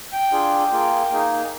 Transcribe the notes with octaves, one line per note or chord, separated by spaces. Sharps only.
G5
D4 F4 G#4
A#3 F4 G#4
A#3 D#4 G#4